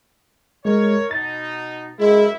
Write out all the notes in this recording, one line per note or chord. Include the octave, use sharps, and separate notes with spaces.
G#3 A#4 C#5
B2 D#4 A6
F#2 G#3 E4